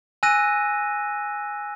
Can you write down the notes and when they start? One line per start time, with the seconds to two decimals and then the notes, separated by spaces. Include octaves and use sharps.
0.23 G#5 E6 F#6 A#6 D#7